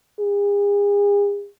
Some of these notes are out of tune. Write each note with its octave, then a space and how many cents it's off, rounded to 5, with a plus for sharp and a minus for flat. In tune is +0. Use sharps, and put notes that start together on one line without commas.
G#4 -40